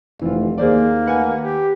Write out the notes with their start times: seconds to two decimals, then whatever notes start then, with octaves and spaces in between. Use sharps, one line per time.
0.21 F1 E3 F4
0.58 D#2 A#3 G#4 C5 D5
1.06 B4 F#5 G#5
1.40 G4